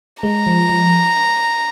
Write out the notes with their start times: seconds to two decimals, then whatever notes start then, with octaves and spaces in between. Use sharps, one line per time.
0.23 G#3 A#5
0.47 F3
0.69 F3